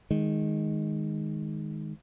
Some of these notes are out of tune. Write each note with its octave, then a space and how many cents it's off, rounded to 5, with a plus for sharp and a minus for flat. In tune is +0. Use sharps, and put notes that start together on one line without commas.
D#3 +0 G#3 +0